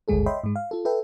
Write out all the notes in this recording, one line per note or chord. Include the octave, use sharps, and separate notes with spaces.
G#1 D2 G2 G#3 G#4 A4
C#5 D#5 E5 G5 B5 C6
G#2 G#3
F5
F4 A4
A4 B4 E5 G5